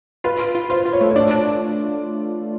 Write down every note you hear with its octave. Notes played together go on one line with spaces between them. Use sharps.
F4 B4
F4
F4
F4 C5
F4
C#5
A3
C#5
D4 D5
D4